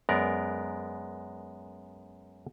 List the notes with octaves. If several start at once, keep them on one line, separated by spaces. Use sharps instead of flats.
F#2 G#3 B3 A#4 D5